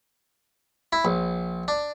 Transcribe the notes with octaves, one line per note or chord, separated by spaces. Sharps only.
E4
A#1
D4